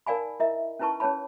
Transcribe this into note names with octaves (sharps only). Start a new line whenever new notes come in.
D#4 A#4 D5 F5 G#5 B5
E4 A#4 D#5 E5
C#4 D#4 E4 B4 A5 C#6
C#4 G#4 B4 C#5 A5 B5